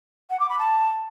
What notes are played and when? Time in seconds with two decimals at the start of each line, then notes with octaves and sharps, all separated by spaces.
0.30 F#5
0.40 D6
0.49 B5
0.59 A5